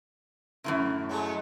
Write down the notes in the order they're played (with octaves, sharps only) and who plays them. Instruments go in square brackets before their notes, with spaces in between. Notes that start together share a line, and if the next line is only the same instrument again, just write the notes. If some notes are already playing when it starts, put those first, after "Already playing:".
[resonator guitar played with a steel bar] F#2 A2 C3
[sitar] F#3 G#3 A3